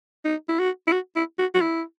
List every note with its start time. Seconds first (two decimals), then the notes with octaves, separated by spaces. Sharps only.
0.25 D#4
0.49 E4
0.59 F#4
0.87 E4
0.92 F#4
1.16 E4
1.39 F#4
1.54 F#4
1.61 E4